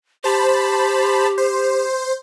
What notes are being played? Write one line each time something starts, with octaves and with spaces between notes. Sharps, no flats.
G4 C5 A5 B5
C5